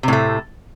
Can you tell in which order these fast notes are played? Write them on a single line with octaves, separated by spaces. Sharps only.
C3 A2 A3